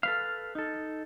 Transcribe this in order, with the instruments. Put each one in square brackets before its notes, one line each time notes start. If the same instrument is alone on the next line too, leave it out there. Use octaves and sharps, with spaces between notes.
[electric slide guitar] A4 B4 F5 [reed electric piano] F6
[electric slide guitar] D#4 A4